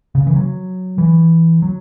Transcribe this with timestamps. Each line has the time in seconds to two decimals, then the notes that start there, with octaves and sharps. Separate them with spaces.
0.15 C#3
0.27 E3
0.36 F#3
0.98 E3
1.62 F#3